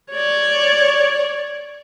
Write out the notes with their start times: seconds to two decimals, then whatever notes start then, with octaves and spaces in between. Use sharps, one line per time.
0.12 C#5 D5